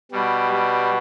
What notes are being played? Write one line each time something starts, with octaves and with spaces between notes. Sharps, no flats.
B2 G3
G3